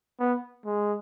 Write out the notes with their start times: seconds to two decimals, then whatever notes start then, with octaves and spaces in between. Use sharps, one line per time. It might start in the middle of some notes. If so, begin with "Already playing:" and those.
0.19 B3
0.65 G#3